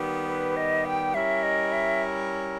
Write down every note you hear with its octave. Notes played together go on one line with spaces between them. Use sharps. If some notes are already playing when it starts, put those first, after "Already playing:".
Already playing: D#3 G3 B3 G4
B4
D#5
G5
G3 C#4 E4 A#4 E5
D#5
E5